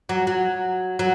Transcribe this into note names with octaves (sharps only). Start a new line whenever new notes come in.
F#3
F#3
F#3